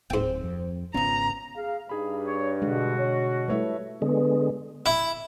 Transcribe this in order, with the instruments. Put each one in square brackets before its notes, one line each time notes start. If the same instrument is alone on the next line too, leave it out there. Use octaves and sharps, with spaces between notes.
[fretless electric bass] D1 [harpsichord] G#2 G5 [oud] C4 C5
[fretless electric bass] F2
[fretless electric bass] G#1 B3 C#4 [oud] C#3 F4 [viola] A#5
[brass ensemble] G#4 F5
[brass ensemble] G2 [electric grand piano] D#4 G#4 B5
[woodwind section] C#5
[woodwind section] B2 F#4 [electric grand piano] D3 [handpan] G#3
[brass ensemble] C#5
[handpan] G3 A3 E4 [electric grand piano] B4 C#5 E5
[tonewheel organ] D3 G#3 [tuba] B3
[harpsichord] E4